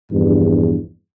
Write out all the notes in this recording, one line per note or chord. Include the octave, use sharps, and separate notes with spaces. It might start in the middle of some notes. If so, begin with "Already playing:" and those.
A#1 E2 G2